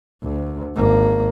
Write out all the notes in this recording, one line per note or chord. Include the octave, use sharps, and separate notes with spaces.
D2
G#1 A#3